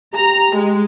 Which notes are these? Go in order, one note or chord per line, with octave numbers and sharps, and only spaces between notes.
G4 A#5
G#3